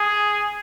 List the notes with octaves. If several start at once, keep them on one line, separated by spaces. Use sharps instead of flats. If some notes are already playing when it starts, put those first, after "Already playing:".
Already playing: G#4